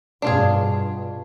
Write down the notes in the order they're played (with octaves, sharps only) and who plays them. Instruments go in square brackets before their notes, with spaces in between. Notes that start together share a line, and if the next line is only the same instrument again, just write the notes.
[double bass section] G2 B2 [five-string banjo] D4 F4 G#4